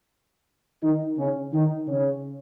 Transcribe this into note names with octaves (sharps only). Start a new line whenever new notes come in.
D#3 D#4
C#3 C#4
D#3 D#4
C#3 C#4